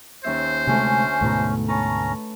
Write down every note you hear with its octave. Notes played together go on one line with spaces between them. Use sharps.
D#2 C#4 C5 E5
D2 C3 G#3 A3 C#4 G#5
D2 G#2 B2 A3 A#5
C#4 B4 C#5 A5 A#5